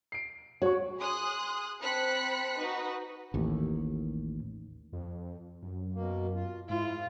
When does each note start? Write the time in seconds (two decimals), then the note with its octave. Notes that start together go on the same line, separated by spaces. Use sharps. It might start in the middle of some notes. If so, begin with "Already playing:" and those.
0.12 C7 D7
0.62 F#4 C#5 C#6
0.98 G#4 C6 D#6 F#6
1.81 C4 A5 B5 F#6 B6 C#7
2.58 D#4 F#4 B4
3.34 A1 D#2
4.93 F2
5.63 F#2
5.95 B2 A#3
6.35 F4
6.69 G#2 E4 F4